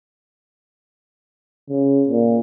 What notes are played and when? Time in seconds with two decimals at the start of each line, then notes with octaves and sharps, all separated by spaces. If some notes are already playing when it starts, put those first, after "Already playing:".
1.69 C#3
2.09 A#2